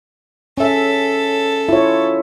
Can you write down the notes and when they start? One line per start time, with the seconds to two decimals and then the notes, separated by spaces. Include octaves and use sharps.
0.58 C#4 A4 E5
1.69 E4 F4 C#5